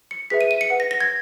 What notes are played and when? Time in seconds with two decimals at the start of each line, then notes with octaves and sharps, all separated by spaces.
0.11 C#7
0.30 G#4 B4 E5 B6
0.41 D#7
0.51 D#7
0.61 C#7
0.70 B4 F#5
0.80 A#6
0.91 A#6
1.01 G#6